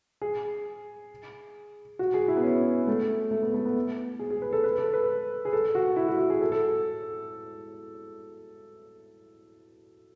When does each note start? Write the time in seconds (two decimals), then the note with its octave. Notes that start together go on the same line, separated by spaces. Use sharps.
0.22 G#4
1.99 F#4
2.14 G#4
2.28 E4
2.37 B3
2.44 C#4
2.87 A3
3.31 A3
3.42 B3
3.54 A3
3.65 B3
4.19 G#4
4.30 G#4
4.42 B4
4.53 A4
4.64 B4
4.78 A4
4.93 B4
5.45 G#4
5.53 A4
5.75 F#4
5.96 E4
6.08 F#4
6.19 F#4
6.30 G#4
6.41 A4
6.52 A4